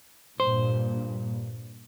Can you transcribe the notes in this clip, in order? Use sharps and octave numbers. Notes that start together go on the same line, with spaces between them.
G2 A#2 C5